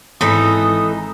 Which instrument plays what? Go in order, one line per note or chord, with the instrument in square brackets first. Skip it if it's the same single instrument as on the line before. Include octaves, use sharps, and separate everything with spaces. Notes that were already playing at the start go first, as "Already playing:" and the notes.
[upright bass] G#1 G#3 [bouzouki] E3 D#4 A4 [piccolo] D#6